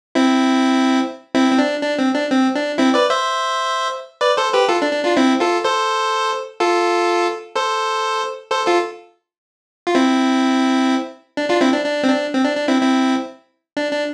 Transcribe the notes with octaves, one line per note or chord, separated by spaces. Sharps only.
C4 E4
C4 E4
C4
D4
D4
C4
D4
C4
D4
C4 E4
B4 D5
C5 E5
B4 D5
A4 C5
G4 B4
F4 A4
D4
D4
D4 F4
C4 E4
F4 A4
A4 C5
F4 A4
A4 C5
A4 C5
F4 A4
F4
C4 E4
D4
D4 F4
C4 E4
D4
D4
C4
D4
C4
D4
D4
C4 E4
C4 E4
D4
D4